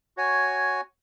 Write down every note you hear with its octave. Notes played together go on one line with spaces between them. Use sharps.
F#4 C#5 G#5